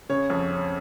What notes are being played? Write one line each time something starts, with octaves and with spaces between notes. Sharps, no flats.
C#3 C#5
F2
C#4